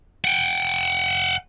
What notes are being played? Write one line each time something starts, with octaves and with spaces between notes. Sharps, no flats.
F#5 G5